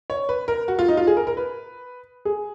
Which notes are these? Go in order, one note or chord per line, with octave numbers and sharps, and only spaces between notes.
C#5
B4
A#4
F#4
F4
D#4
F4
G#4
A#4
A#4
B4
G#4